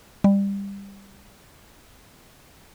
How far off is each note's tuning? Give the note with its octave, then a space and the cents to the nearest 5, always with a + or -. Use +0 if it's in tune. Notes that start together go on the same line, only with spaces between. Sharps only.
G3 +20